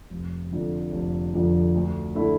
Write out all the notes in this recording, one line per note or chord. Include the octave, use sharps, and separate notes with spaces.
F1
F2 D3 F3
F1
F2 D3 F3
D2
D3 A3 E4